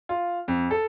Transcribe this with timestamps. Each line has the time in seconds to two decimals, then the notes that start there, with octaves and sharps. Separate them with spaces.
0.09 F4
0.48 F2
0.71 A4